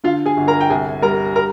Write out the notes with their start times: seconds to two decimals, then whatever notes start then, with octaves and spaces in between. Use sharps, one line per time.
0.04 D3 F4 F5
0.26 G#4 G#5
0.37 G1
0.47 A#4 A#5
0.61 G5
0.70 C2 G#4 G#5
1.02 G3 A#4 A#5
1.36 A#4 A#5